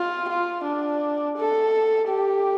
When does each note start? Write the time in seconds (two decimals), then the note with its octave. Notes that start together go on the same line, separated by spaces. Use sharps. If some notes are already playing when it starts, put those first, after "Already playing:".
Already playing: F4
0.29 F4
0.65 D4
1.37 A4
2.08 G4